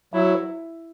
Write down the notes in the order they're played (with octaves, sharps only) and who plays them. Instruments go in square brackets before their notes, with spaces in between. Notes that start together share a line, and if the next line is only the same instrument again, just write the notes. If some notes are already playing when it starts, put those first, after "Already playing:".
[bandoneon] F#3 [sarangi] E4